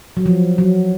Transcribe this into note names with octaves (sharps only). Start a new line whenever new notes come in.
F#3
F3
F#3